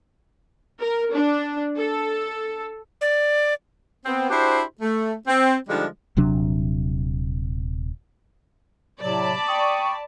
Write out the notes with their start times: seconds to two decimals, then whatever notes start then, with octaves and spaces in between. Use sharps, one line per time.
0.80 A#4
1.15 D4
1.78 A4
3.01 D5
4.05 B3 C4
4.30 D4 E4 F#4 G4 C5
4.81 A3
5.27 C4
5.68 D3 F3 G3 G#3 D4 D#4
6.17 D#1 C3 F#3 D4
9.00 A2 C3 F#3 D5 A5 B5
9.48 G5 C#6 D#6